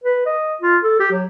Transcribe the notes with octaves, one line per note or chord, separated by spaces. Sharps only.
B4
D#5
F4
A4
G4
F#3